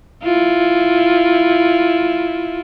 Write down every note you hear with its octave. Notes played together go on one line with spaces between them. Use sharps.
E4 F4